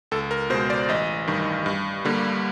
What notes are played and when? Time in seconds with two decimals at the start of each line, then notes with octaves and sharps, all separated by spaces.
0.11 C#2 A4
0.31 A#4
0.50 B2 C5
0.54 G#3
0.70 D5
0.89 A1 D#5
1.27 G2 D#3
1.66 G2
2.05 D3 G3 A#3